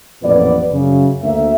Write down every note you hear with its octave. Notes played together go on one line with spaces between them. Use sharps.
A1 F2 A#2 B3 B4 D5
F#2 C#3
D2 A#3 E5